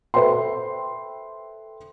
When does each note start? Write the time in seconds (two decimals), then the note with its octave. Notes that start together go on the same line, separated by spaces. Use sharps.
0.14 A4 B4 C5 E5 G5 C6